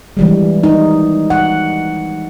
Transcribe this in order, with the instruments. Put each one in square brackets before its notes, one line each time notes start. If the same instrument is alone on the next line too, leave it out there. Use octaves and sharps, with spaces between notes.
[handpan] E3 G3 G#3
D#4
F#5